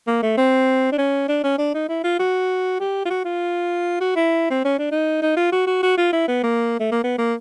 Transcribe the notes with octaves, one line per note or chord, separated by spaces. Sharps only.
A#3
A3
C4
D4
C#4
D4
C#4
D4
D#4
E4
F4
F#4
G4
F4
F#4
F4
F#4
E4
C4
C#4
D4
D#4
D#4
F4
F#4
F#4
F#4
F4
E4
B3
A#3
A3
A#3
B3
A#3